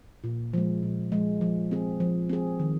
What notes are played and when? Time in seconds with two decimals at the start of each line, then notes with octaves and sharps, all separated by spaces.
0.24 A#2
0.53 F3 G#3
0.83 A#2
1.12 F3 G#3
1.41 F3
1.71 C4 G#4
2.00 F3
2.29 C4 G#4
2.59 D#3